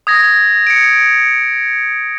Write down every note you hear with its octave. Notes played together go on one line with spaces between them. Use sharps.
D#6 G#6 A#6
C#7 D7